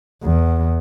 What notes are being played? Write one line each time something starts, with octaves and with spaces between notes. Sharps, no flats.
E2